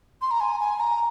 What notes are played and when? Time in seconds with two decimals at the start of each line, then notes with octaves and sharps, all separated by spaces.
0.22 C6
0.31 A#5
0.40 G#5
0.60 G#5
0.80 A#5